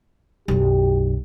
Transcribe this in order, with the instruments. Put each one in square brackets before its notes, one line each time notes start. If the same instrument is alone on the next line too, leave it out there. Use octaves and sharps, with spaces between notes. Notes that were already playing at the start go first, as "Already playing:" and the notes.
[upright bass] B1 F#2 [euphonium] G4